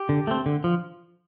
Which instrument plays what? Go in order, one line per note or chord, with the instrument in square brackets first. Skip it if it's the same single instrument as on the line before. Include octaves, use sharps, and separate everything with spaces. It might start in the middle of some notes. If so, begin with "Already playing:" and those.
Already playing: [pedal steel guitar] G4
D3
A3 C4
D3
F3